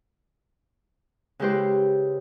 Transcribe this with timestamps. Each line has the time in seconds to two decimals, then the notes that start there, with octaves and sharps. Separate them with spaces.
1.40 C#3 G#3 E4 G4 B4 C5